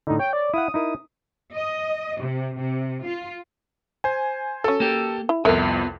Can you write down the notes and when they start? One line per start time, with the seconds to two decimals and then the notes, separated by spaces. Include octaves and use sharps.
0.07 A2 D3 D#4
0.19 C#5 G5
0.33 D5
0.54 E4 F5 F#5 D#6
0.74 D#4 E4 A#4 D#6
1.55 D#5
2.19 C3
2.58 C3
3.03 F4
4.04 C5 G#5
4.64 F#3 C#4 A4
4.80 A#3 G4
5.29 E4
5.45 C2 F2 B3 F4 A4 A#4 E5